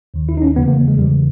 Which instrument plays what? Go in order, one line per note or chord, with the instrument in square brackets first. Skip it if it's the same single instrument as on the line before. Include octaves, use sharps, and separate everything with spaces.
[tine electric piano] D#2 D#3
E4
D#4
C#4
E2 C#3 E3 B3
A#3
G#3
E2 C#3 E3 G3